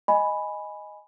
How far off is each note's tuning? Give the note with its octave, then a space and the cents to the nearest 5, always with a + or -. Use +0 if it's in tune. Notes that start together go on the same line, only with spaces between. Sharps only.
D#5 +0 G#5 +0 B5 +0